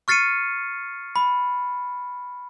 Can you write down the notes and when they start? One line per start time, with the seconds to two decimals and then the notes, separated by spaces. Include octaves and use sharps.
0.08 C#6 F6 A6 C7 C#7 D#7
1.16 B5